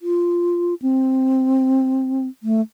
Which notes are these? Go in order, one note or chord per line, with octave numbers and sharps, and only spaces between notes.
F4
C4
A3